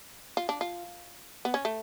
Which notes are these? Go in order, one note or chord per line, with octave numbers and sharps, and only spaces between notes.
F4
D4
F4
B3
C#4
A3